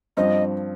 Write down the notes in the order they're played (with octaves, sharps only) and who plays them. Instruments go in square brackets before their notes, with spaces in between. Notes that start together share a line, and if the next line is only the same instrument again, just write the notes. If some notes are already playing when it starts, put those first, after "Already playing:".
[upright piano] G2 F3 C4 [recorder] D#5